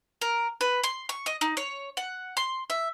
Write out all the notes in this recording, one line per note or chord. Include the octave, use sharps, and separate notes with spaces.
A#4
B4
C6
C#6
D#5
D#4
C#5
F#5
C6
E5